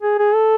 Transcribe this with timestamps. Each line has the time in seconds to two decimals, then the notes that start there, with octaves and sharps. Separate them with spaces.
0.02 G#4
0.19 G#4
0.35 A4